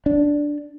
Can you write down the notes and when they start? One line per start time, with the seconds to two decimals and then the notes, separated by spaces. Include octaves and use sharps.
0.06 D4